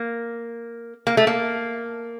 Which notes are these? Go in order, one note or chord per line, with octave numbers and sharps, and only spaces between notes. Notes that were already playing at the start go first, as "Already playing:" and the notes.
Already playing: A#3
A#3
A3
A#3